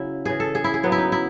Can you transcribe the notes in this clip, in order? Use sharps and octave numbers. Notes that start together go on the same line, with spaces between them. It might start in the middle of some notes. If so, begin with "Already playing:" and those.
Already playing: C#3 F#3 E4
C#3 E3 G#4
A4
G#4
E4
G#4
C#3 F#3 B3
E4
D#4
E4